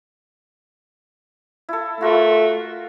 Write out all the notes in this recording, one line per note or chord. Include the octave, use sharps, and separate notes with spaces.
E4 A4
A3 F4 F#4 A#4